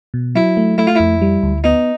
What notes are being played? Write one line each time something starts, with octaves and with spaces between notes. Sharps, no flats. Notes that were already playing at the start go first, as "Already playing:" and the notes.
B2
F#3 E4
A3
A3 E4
F4
F2 E4
G3
D2
B3 D#4